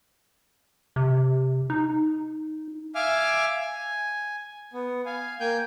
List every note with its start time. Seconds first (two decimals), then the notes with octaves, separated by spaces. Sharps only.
0.96 C3
1.70 D#4
2.95 E5 F5 G#5 D6 F6
3.61 G#5
4.73 B3
5.06 F5 G#5
5.40 A#3 G5 G#5 G6